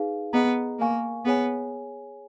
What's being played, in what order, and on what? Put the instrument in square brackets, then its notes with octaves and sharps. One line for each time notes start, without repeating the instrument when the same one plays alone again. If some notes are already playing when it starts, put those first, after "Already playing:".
Already playing: [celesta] D#4 G#4 B4 F5
[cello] B3 [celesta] G#4 D#5 A#5
[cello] A#3 [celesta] A#4 F5 G#5 C#6
[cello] B3 [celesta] G#4 C#5 G#5